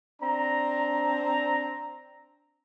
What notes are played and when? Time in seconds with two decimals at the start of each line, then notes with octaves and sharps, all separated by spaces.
0.21 C4 D4 A#5